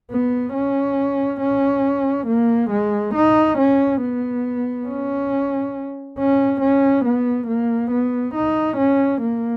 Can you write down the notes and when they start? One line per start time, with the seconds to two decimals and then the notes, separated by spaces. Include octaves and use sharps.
0.11 B3
0.54 C#4
1.41 C#4
2.27 A#3
2.70 G#3
3.15 D#4
3.58 C#4
4.02 B3
4.87 C#4
6.18 C#4
6.61 C#4
7.05 B3
7.48 A#3
7.91 B3
8.35 D#4
8.77 C#4
9.22 A#3